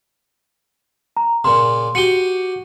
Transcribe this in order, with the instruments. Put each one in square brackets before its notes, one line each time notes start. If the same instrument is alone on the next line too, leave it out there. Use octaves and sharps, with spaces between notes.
[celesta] A#5
[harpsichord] A#2 C#3 [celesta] C6
[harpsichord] F#4 G4 [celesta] C#7 D#7 G7